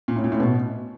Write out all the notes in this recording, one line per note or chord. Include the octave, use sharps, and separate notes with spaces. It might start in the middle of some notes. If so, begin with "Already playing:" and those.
A#2
A2
A#2
A2
B2